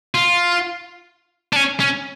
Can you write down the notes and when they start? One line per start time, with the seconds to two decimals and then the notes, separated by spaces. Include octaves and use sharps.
0.15 F4
1.53 D4
1.56 C#4
1.80 C#4